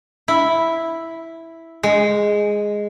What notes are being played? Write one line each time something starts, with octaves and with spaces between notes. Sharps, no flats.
E4
G#3